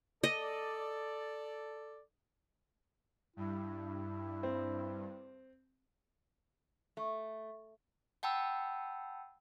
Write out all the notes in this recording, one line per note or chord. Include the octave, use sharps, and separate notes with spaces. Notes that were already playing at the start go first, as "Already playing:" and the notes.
A4 D5 D#5
G2 E4
C4
A3
F#5 G5 A5 B5 E6